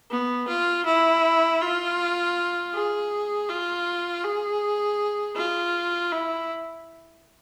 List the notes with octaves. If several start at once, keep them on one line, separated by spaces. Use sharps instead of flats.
B3
F4
E4
F4
G#4
F4
G#4
F4
E4